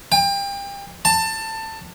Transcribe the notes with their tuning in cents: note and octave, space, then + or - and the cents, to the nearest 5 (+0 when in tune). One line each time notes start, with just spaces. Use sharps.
G5 +30
A5 +20